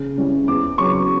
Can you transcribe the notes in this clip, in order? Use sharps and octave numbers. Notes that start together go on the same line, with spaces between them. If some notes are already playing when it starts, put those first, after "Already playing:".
Already playing: C#3
E3 G3 C#4
E2 D6
C#3 F#3 C#4 C#6